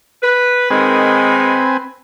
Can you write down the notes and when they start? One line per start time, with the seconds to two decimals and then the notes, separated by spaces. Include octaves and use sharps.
0.22 B4
0.70 D#3 G#3 C4 B4 G#5